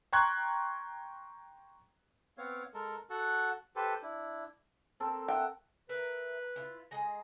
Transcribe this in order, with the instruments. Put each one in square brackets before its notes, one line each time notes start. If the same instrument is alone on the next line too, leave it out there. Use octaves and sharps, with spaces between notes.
[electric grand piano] G5 A#5 C6 C#6 F#6 G#6
[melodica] B3 C4 C#5 F5
G#3 A4 A#4
F#4 A4 F#5
G4 A4 B4 C5
D4 E4
[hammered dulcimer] C4 A4 A#4
[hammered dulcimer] E5 F#5 [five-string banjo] G5
[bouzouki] A#4 E5 [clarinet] B4
[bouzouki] E4 F4
G#3 G#4 A#5